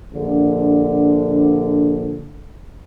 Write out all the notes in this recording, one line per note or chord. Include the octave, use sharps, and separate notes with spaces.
A#1 D3